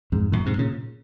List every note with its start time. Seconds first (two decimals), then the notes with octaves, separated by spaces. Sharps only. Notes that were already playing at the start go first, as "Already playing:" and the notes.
0.12 F2 G#2
0.32 F#2 A#2
0.46 G#2 C3
0.58 A#2 C#3